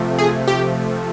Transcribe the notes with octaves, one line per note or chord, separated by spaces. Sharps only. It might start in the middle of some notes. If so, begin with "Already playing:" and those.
Already playing: C3 F3 A3
G#4
G4